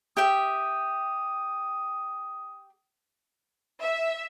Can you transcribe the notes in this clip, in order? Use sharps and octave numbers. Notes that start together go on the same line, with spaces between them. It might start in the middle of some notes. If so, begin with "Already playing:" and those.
G4 E5 G5 D#6
E5